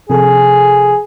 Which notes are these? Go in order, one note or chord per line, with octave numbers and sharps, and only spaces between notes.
C3 F3 G#4 A4